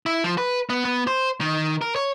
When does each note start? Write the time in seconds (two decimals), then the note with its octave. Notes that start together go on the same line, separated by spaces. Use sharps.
0.06 E4
0.24 F3
0.38 B4
0.70 B3
0.85 B3
1.07 C5
1.41 D#3
1.81 A#4
1.96 C#5